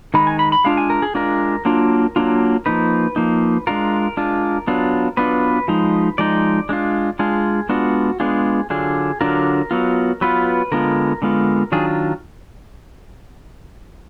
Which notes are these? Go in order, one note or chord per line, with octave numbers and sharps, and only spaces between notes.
D#3 G#3 D#4 B5
G#5
B5
B5
G#3 D4 F4 F5
G#5
A#4
G#4
G#3 D4 F4 A#4
F#3 A#3 D4 F4
F#3 A#3 D4 F4
F3 A#3 D#4 B4
F3 A#3 D#4
G#3 D4 F4 A#4
G#3 D4 F4
F#3 B3 D4 F4
F#3 B3 D4 F4 B4
F3 G#3 D#4
F3 G#3 D#4 D5
G#3 D4 F4
G#3 D4 F4 G#4
G#3 B3 D4 F4 F#4
G#3 B3 D4 F4 G#4
D3 F#3 D4 F4 G#4
D3 F#3 D4 F4 A#4
F#3 B3 F4
F#3 B3 F4 B4
D3 G#3 B3 F4 A#4
D3 G#3 B3 F4
D#3 F#3 D4 F4 G#4